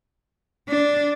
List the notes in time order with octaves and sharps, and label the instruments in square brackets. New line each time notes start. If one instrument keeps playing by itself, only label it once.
[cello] D4